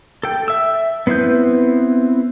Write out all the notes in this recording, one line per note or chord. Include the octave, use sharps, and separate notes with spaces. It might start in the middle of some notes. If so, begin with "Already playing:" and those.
A4 G5
E5 E6
B3 C4 E4 B4 G6